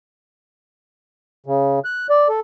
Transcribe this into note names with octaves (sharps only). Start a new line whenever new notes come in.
C#3
F#6
D5
A4